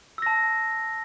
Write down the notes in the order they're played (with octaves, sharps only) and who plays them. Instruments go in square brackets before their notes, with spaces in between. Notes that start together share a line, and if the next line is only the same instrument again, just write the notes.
[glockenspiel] E6
A#6
A5